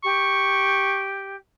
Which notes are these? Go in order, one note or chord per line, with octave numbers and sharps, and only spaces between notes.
G4 C#6